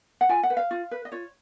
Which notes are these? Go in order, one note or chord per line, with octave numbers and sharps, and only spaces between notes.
F#5
F4 G#5
F#5
B4
F5
F4
B4
D#5
F4 C#5